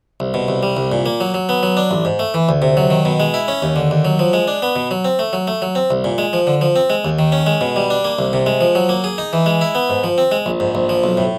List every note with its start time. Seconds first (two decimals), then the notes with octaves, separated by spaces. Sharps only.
0.20 C2
0.34 B2
0.48 C2
0.63 G3
0.77 C2
0.92 A#2
1.06 A#3
1.20 F#3
1.34 F#3
1.49 B3
1.63 F#3
1.77 D4
1.91 A1
2.05 G#2
2.19 A3
2.34 E3
2.49 D2
2.62 C3
2.77 F#3
2.90 D#3
3.05 B2
3.20 G#3
3.34 E4
3.48 C#4
3.62 D#2
3.76 D3
3.91 D#2
4.05 F#3
4.19 F3
4.33 G#3
4.48 D4
4.62 B3
4.76 B2
4.91 F#3
5.05 C4
5.19 A3
5.33 F#3
5.47 A3
5.62 F#3
5.75 C4
5.90 C2
6.04 A#2
6.18 G#3
6.33 F3
6.47 D3
6.61 F3
6.76 C4
6.90 G#3
7.05 D#2
7.19 D#3
7.32 C#4
7.47 G#3
7.61 B2
7.76 G3
7.90 D4
8.05 A#3
8.19 C2
8.33 C3
8.46 G#3
8.61 F3
8.75 F#3
8.89 A#3
9.04 G#4
9.18 D#4
9.33 E3
9.46 G#3
9.61 E4
9.75 B3
9.90 G#2
10.04 F3
10.18 C4
10.32 G#3
10.46 A#1
10.60 G#2
10.75 A#1
10.89 F3
11.04 B1
11.17 A2